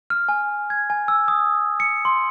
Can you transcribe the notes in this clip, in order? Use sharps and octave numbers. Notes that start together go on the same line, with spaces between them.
F6
G#5
G#6
G#5
E6
D#6
C#7
C6